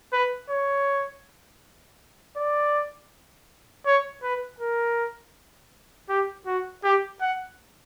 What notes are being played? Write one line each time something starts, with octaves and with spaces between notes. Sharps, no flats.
B4
C#5
D5
C#5
B4
A#4
G4
F#4
G4
F#5